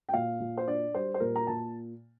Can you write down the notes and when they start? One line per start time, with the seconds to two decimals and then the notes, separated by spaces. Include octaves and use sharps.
0.09 G5
0.13 A#2 F5
0.40 A#2
0.58 C5
0.66 D4 D5
0.95 G3 C5
1.14 C5
1.20 A#2 A#4
1.36 A#5
1.47 A#2 A5